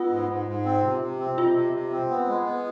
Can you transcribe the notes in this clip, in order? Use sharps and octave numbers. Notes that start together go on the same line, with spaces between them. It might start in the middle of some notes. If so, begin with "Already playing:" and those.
Already playing: B3 F4
G#2
G#2
G#2
C4
C3
C3
C4
C3 F4
C3
C3
C4
B3
G#3
B3